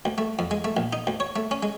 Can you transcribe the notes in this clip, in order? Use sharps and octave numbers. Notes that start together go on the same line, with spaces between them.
D2
A3
F2
G#3
A3
A#1
D#4
D2
C#5
A3
C#4
G#3